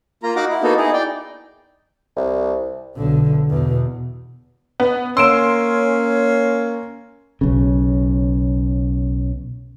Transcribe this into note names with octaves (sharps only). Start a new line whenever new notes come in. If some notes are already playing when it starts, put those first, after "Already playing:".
A#3 F4 A#5
D#4 F#4 F5 F#5 A#5 D6
E4
A#3 B3 D#4 F#4 A4
D#4 E4 G#4
D5 G5
C2
B1 D3
E2 B2
B3
A#3 C#4 C6 E6 D7 E7
B1 C#3